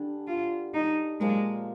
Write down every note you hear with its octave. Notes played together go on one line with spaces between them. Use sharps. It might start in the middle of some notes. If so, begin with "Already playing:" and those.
Already playing: D3 G3 D4 G#4
F4
D#4
A#2 F3 G#3 A#3 F4